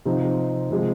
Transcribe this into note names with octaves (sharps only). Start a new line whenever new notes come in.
C3 F3 C4 D#4
C3 F3 G#3 C4